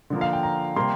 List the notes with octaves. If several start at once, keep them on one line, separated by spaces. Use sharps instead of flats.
D3 F3 A#3
F5
G5
A#5
C3 G3 A#3 C6